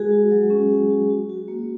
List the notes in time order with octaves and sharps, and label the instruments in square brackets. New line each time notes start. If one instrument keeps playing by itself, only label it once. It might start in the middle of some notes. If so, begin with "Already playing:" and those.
Already playing: [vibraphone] G#3 F#4 G#4
F#4
F#3
C#4
F#4
F#4
F#4
F#4
A#3